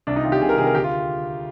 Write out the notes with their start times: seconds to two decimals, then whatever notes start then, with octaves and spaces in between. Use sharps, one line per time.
0.07 C2 D4
0.16 D#4
0.23 C3 D#3 F4
0.32 G4
0.42 C2 G#4
0.49 A#4
0.57 C3 D#3 G#4
0.67 A#4
0.74 D2 G4
0.84 F4